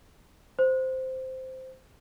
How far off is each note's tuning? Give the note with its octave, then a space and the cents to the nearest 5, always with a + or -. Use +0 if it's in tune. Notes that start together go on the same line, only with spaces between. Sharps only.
C5 -5